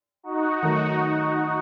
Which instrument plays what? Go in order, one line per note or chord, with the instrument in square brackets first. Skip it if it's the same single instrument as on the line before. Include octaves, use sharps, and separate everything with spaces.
[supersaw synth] D#4 F#4
[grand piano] D#3 F#3 A3